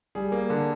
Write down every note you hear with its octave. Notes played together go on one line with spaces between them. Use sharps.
G3 G#4
A#3
D3